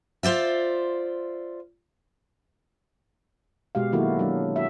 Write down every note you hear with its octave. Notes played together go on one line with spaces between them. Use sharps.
F4 C5 D5 E5
B2 G#3 G4 F5
D#3 F#3 A#3 E4 F#4 A4
F#3 D4
F#4 E5